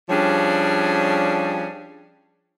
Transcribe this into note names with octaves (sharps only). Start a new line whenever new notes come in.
F3 G3 C#4 D4 G#4 C#5